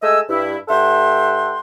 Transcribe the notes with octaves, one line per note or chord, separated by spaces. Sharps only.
G#3 A3 D#5 G#5 E6
G2 E4
G2 A4 E5 F#5 G5 C6